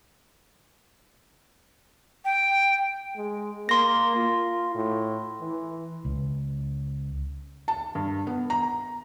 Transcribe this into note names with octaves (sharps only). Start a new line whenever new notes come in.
G5
G#3
A#3 C6 A#6
F4
A2
E3
C#2
A5
G2
B3
A#5